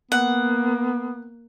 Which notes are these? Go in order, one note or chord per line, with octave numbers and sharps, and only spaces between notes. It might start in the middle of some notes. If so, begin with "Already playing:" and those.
A#3 B3 F#5